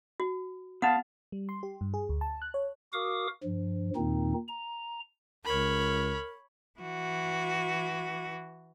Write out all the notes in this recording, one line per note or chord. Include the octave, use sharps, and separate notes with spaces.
F#4
B3 F5 F#5 A5
G3
C6
G4
G2
G#4
D2
A5
F#6
C#5
F#4 A#4 F5 D6 D#6
G2 F3
D#2 A#2 D#3 C4 D#4
A#5
C#2 A#4 C#5 B5
E3 F#4